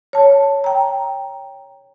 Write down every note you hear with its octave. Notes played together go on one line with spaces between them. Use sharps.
C#5 A5
G5 A#5